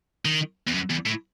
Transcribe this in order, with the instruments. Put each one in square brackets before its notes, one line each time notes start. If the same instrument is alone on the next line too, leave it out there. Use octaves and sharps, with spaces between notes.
[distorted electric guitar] D#3
E2
F#2
E2
A2